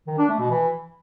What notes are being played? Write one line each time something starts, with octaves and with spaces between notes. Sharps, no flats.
D#3
D4
A3
B2
E3